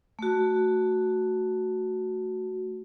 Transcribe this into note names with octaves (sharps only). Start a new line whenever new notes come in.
A3 F#4